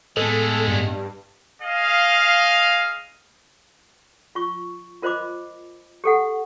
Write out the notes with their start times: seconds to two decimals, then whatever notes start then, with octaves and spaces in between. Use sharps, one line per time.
0.17 A2 D#3 G#3 A3 B3 A4
0.67 G2
1.61 G#4 D#5 F5
4.35 F4 C#6
5.02 F4 A#4 C5 D#5 B5 D6
6.04 G4 A4 F#5